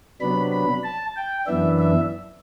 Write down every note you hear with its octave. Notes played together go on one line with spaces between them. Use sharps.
C3 F#3 B3 D4 B5
B5
A5
G5
F#2 E3 B3 D4 E5
E5